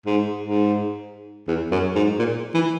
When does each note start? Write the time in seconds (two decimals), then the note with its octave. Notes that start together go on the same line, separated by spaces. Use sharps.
0.06 G#2
0.41 G#2
1.48 E2
1.72 F#2
1.95 G#2
2.19 A#2
2.54 E3